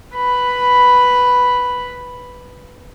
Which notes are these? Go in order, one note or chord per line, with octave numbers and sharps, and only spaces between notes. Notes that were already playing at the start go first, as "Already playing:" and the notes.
B4 B5